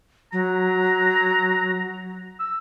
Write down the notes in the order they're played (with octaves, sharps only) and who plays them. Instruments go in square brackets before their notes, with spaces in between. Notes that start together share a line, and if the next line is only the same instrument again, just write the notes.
[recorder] F#3 [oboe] A#5
[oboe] E6